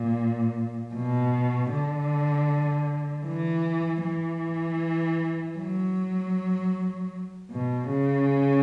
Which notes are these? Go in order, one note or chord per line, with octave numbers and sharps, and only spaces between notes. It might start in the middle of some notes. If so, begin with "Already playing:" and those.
Already playing: A#2
B2
D3
E3
E3
F#3
B2
C#3